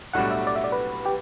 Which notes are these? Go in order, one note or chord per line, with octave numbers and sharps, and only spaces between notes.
B1 A2 G3 D4 F#4 F#5
E5
D5
E5
D5
B4
G4